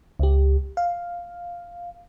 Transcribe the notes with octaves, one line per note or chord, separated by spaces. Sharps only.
C#2 G4
F5